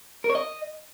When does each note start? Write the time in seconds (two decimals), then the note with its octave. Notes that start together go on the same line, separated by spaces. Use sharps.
0.24 A#4
0.30 C#5
0.35 D#5